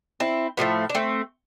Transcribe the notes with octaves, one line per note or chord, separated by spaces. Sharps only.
C4 E4
A2 F3 A3 B3
D4
A3 C4